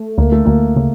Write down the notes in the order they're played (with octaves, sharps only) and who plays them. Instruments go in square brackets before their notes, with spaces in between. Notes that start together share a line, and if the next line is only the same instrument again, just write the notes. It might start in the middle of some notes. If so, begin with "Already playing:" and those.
Already playing: [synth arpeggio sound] A3
[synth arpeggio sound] D2 [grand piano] A#3
[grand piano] A3
[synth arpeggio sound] D2 [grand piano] A#3
[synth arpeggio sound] C#3